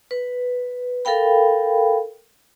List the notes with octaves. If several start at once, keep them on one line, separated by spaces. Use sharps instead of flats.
B4
A4 A#4 F5 G5 B5